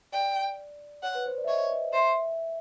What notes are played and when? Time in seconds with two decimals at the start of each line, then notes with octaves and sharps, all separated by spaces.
0.12 D5 G5
1.03 C#5 F#5
1.15 B4
1.26 C5
1.37 D5
1.44 E5
1.48 C#5 D#5
1.70 D#5
1.93 C5 E5